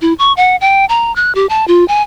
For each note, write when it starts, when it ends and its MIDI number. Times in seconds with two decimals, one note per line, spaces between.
0.02 0.13 64
0.19 0.33 85
0.37 0.56 78
0.61 0.85 79
0.89 1.14 82
1.16 1.34 90
1.35 1.46 67
1.49 1.67 81
1.68 1.86 65
1.88 2.02 80